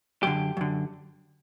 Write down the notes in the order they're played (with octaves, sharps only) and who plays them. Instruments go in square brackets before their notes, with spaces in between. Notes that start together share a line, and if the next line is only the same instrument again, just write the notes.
[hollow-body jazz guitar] F#2 D3 G4
F#2 D3